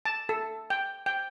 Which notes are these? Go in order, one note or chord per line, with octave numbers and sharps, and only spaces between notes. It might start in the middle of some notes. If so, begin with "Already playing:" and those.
A5
A4
G5
G5